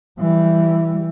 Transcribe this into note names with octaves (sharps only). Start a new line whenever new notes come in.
E3 G3